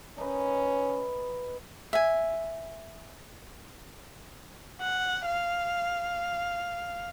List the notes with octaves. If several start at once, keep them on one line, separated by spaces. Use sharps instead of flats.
C#4 D#4 B4
E5 G#5
F#5
F5